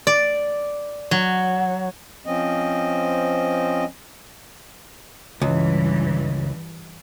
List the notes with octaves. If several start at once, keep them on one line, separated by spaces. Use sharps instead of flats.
D5
F#3
F3 C4 C#4 D#5
C#2 G2 E3